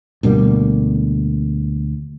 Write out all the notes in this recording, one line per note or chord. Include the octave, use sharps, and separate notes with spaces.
D2 B2 G3 A#3